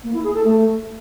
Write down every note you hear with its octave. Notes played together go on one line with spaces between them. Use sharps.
A#3
E4
G#4
A4
A3